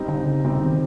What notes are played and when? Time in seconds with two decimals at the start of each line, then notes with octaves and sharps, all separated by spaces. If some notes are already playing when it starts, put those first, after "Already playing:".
Already playing: G3 C4 D#4 G4
0.08 D3
0.19 C#3
0.45 C#3 G3 C4 D#4 G4
0.61 D#3